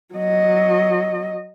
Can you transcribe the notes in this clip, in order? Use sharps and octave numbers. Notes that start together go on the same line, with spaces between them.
F#3 D#5